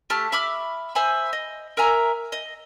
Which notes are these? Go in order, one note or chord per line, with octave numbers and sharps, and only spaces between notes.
A3 G4 A5 F6
E5 B5 D6 F6
C5 E5 G#5 B5
D#5
A#4 E5 G#5 A#5
D#5